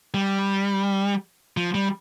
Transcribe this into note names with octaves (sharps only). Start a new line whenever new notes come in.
G3
F3
G3